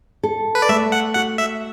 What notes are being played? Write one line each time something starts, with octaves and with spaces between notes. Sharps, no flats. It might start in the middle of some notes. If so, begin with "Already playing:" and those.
A4
B4
D5
A3 E5
F#5
F#4 F#5
E5